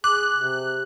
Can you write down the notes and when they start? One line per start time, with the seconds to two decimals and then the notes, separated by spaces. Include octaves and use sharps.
0.04 G#4 D6 F#6
0.35 C3